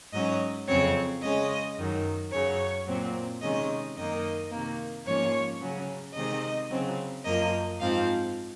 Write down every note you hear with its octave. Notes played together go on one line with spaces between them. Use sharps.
G#2 F#3 C#4 D#5
F2 C#3 F#3 C4 C#5
C#3 G#3 C#4 D#5
F#2 D#3 F#3
F#2 C#3 F#3 C#5
A#2 F#3 C4
C3 D#3 G#3 C#4 D#5
F#2 D#3 A#3 D#5
C3 D#3 A#3
G#2 F3 A#3 C#4 C#5
C#3 F#3 C#4
C3 D#3 G#3 C4 D#5
C#3 F#3 C4
F#2 F3 A#3 D#5
G#2 F3 C4 F5